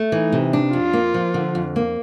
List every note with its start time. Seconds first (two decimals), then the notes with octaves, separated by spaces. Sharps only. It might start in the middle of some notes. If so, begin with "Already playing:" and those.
Already playing: A3
0.12 E3 D#4
0.32 C3
0.53 D4
0.73 F2 F4
0.93 A#3
1.14 F3
1.34 D3
1.55 F2
1.76 A#3